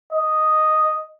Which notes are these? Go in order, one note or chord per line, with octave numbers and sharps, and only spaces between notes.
D#5